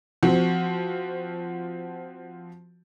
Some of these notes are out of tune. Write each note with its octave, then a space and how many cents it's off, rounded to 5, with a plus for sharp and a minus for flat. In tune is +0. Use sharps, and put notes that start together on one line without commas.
F3 +0 C4 -15 F#4 +0